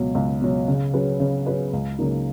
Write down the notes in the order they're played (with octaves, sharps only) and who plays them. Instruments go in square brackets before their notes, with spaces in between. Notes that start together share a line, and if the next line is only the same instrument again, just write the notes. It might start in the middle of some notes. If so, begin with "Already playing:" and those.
Already playing: [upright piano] C#2 B2 F#3
C#2
B2 F#3
C#3
F#3 C#4 G#4 B4
C#3
F#3 C#4 G#4 B4
C#2
C#3 F#3 A#3 D#4